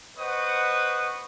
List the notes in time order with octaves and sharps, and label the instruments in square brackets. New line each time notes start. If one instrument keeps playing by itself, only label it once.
[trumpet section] B4 C5 D#5 F#5 C#6 D#6